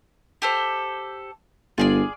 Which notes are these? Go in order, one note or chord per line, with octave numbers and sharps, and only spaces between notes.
G4 A4 C5
G1 F4 G#4 D5